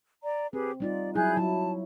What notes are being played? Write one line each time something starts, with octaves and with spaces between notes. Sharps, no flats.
D5 A#5
C4 G4 G#4 B4
G3 D#4 F4 D5
F#3 E4 G#4 F#6 G6
F#3 E4 A5